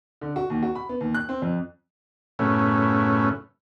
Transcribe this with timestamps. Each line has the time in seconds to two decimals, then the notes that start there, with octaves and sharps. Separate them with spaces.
0.21 D3
0.36 F#4
0.50 D#2
0.63 F#4
0.75 B5
0.89 B3
1.01 D#2
1.15 F#6
1.29 C4
1.42 F2
2.39 F#2 A2 C#3 A3 B3 C#4